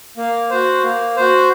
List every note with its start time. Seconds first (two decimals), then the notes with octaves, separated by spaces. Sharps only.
0.17 A#3
0.50 F#4 C5
0.83 A#3
1.16 F#4 C5